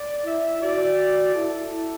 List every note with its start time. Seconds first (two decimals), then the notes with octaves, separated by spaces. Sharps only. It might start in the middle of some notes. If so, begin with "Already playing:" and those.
Already playing: D5
0.25 E4 E5
0.62 F#4 D5
1.35 E4 A4